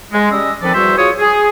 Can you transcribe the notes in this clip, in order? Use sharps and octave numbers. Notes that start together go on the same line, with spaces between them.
G#3
G3 C#4 G4 D#5 D#6 E6
D#3 F3 C4 A4 B4 D5
E2 G3 F#4 C5 E5
F4 F#4 G#4 C#5 C#6 D#6
G#4